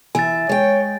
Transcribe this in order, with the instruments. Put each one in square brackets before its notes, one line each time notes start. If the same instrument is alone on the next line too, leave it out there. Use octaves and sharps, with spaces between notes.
[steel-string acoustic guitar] E3 E5 [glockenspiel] G#5 A6
[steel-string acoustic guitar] G#3 G5 [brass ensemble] C#5